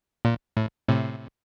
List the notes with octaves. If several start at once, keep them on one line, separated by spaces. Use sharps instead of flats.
A#2
A2
A2 C3